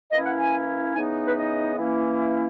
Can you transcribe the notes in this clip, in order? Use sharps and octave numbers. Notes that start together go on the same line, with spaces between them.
E3 A#3 C#4 E4 D#5
F#5
G#5
C#3 E3 B3 D#4 G#5
B4
D#5
E3 A#3 C#4 E4